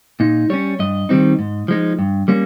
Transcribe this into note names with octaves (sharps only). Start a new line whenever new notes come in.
A#2 D#4
G3 C#4 C#5
G2 D#5
D#3 G3 C4 D#4
G#2
F3 G#3 D#4
G2
G3 A#3 C#4